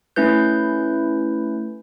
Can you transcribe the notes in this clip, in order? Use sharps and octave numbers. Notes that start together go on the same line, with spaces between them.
A3 C#4 E4 B4 G6